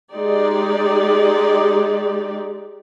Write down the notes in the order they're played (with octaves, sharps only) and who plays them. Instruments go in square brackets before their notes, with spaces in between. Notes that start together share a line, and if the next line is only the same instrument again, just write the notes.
[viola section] G#3 D#4 G4 D5